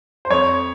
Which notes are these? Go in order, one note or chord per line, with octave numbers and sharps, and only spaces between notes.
C5
F2 C#5